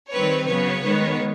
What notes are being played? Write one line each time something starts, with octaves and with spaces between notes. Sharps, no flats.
D#3 G3 C4 B4 C#5
C#3 F#3 B3 B4 C#5
D#3 G#3 B3